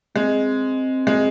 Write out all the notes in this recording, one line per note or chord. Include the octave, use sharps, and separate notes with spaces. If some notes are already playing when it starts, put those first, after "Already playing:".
G#3 C4
G#3